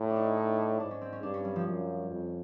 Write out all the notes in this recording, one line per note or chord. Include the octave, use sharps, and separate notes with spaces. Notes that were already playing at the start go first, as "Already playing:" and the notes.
Already playing: A2
D4
D#4
D#4
D4
G#2 D4
C#4
C4
C#4
G2 D4
C#4
G3
F3
F#2
F2